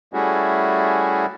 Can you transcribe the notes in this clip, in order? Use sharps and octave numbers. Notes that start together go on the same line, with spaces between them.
G3 A3 C#4 E4 F#4 G#4